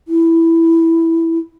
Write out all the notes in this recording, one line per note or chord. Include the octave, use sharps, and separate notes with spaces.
E4